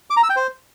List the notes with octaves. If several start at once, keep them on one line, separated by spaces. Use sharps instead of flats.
D6
A#5
E6
G5
C5